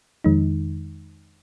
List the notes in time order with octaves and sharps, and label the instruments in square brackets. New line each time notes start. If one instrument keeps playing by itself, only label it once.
[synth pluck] F2 D#3 G#3 D#4